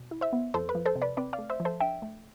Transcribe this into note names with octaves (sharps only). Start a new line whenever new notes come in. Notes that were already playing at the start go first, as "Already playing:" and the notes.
Already playing: B2
E4
C5 E5
B3
F2 A4 C5
B4
F3
A4 C5
C3
B4 D5
C4 B4 D5
D5 F5
A3
C5 E5
F3
A4 C5
D4 E5 G5
A3